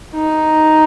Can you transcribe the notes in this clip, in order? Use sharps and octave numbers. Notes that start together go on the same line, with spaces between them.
D#4